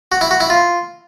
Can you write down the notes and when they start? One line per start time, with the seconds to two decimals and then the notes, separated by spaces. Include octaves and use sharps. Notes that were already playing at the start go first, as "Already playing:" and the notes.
0.12 F#4
0.21 E4
0.31 F#4
0.40 E4
0.50 F4